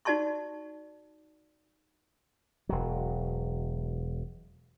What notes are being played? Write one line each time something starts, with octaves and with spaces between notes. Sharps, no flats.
D#4 F#4 D5 A5 C6 C#6
E1 F#3